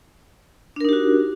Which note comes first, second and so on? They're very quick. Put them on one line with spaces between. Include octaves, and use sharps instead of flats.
D4 A#4 D#4 G4 F#4